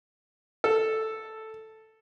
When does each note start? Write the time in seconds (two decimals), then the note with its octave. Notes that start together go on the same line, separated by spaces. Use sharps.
0.64 A4